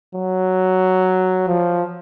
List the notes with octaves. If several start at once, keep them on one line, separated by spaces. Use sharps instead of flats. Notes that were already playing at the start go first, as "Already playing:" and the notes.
F#3
F3